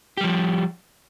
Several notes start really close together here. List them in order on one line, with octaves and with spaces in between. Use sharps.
G4 G3 F3